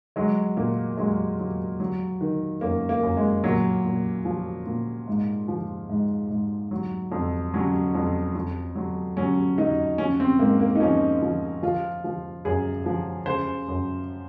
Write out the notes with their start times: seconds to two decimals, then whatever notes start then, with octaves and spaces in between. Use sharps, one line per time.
0.16 F#3 G#3
0.57 A#2 A#3
0.97 F#3 G#3
1.39 F#3
1.80 F#3
2.21 D#3
2.61 F#2 A#3
2.89 A#3
3.03 F#2
3.17 G#3
3.44 A#2 F#3
3.85 A#2
4.25 F3
4.66 A#2
5.08 G#2
5.48 F3
5.89 G#2
6.30 G#2
6.71 F#3
7.12 F2
7.54 F#3 C#4
7.95 F2
8.35 F2
8.75 F#3
9.17 F#3 C#4
9.58 F#3 D#4
9.98 F3 C#4
10.20 C4
10.39 G#2 A#3
10.60 A#3
10.76 D#4
10.80 F3 C#4
11.22 F3
11.62 F3 F4
12.04 F3
12.45 F#2 G#4
12.86 F3
13.26 C#3 C5
13.68 F#2